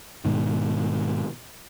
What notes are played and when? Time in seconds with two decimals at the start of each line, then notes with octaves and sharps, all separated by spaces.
0.25 G#2 B2 D#3